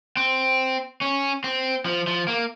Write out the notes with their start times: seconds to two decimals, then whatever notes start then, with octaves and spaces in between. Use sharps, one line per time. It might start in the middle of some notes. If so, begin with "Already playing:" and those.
0.17 C4
1.01 C#4
1.44 C4
1.86 F3
2.07 F3
2.28 A#3